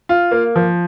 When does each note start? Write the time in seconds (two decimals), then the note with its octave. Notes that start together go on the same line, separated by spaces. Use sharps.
0.09 F4
0.31 A#3
0.56 F3